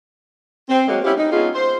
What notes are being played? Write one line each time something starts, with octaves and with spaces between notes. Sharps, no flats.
C4
F#3 G#3 A#3
B3 C#4 E4 F4 G4
D#4
G#3 B3 C#4 D#4 F4 G#4
C5